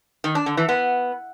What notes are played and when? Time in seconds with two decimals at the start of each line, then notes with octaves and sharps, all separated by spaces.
0.24 D#3
0.35 D4
0.46 D3
0.57 E3
0.69 B3